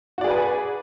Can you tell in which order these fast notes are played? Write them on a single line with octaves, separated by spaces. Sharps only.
F#4 D5 G#4 B4 G#5